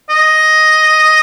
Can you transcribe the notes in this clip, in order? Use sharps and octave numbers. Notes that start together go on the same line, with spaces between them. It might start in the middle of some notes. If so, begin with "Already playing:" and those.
D#5